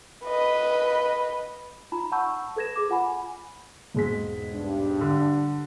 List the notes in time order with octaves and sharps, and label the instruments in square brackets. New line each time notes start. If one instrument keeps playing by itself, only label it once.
[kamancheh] B4 D#5
[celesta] D#4 F4 A#5 B5
F#5 A5 B5 C#6 E6 G6
A4 B4 G#6 A#6 E7
G#4 D6
F4 F#5 G#5 B5
[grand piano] E1 G#3 B6 [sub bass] G#2
[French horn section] G2 D4
[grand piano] D3